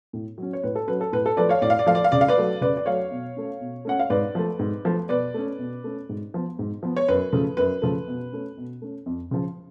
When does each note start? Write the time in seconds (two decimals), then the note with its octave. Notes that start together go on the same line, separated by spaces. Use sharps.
0.13 A2
0.38 F#3 C#4
0.53 C#5
0.63 A2 B4
0.75 A4
0.87 F#3 C#4 B4
1.01 A4
1.13 A2 B4
1.26 A4
1.37 F3 A3 B4 D5
1.49 C#5 F5
1.62 A2 D5
1.70 F5
1.79 D5
1.87 F3 A3 F5
1.95 D5
2.04 F5
2.12 C#3 D5
2.21 F5
2.28 B4 D5
2.37 F#3 A3
2.61 C#3 B4 D5
2.77 D5
2.86 F#3 A3 C#5 F5
3.11 B2
3.36 A3 C#4
3.60 B2
3.85 A3 C#4 F#5
3.99 F5
4.10 G#2 B4 D5
4.35 F3 A3
4.59 G#2
4.85 F3 A3
5.09 B2 B4 D5
5.34 A3 C#4
5.59 B2
5.84 A3 C#4
6.09 G#2
6.34 F3 B3
6.59 G#2
6.83 F3 B3
6.96 C#5
7.08 F#2 B4
7.32 C#3 F3 A3
7.57 F#2 B4
7.82 C#3 F3 A3
8.08 B2
8.32 A3 C#4
8.57 B2
8.82 A3 C#4
9.06 F2
9.31 C#3 F3